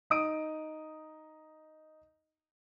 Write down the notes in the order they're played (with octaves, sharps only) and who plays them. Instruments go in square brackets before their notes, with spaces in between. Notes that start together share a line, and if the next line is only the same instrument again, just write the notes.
[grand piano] D#4 D#6 D7